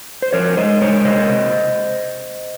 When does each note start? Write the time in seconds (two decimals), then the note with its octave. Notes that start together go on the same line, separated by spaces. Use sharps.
0.22 C5
0.33 F3 A#4 C#5
0.57 G#3 C5 D#5
0.81 G#3 A#4 C#5
1.05 C3 C5 D#5
1.29 C3